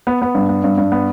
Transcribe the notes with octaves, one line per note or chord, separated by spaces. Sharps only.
B3
B3
G2
B3
G2
G2
B3